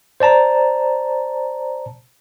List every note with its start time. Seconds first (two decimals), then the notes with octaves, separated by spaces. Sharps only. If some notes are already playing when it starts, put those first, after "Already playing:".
0.20 C5 D5 A5 A#5